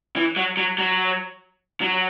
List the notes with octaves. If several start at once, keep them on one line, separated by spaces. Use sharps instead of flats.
E3
F#3
F#3
F#3
F#3